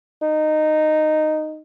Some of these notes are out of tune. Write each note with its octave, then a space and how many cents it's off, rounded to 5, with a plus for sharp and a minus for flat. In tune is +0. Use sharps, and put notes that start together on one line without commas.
D#4 -10